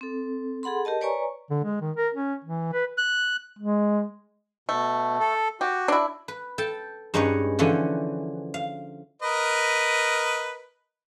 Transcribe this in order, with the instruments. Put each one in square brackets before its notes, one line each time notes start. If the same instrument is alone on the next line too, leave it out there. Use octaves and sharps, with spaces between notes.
[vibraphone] C4 A4
G#4 A4 F#5 B5 C6
G4 A#4 D#5 A5
B4 C#5 D5 G#5 A#5 C#6
[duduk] D3
G#3
D#3
A#4
C#4
E3
B4
[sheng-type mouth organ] F#6
[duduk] G#3
[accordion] B2 [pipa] A3
[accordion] A4
[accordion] F#4 [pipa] G4
[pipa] D4 E4
[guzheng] B4
A4 G5 A5
G2 G#3 C#4 D#4 B4 C#5
D3 E3 F3 C#4
F5
[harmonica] A#4 B4 D#5